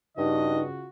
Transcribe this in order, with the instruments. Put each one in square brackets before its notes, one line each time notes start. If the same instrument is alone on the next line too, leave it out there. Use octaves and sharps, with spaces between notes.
[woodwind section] G2 [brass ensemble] C#3 F4 F#4 [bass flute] D#4 [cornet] D#5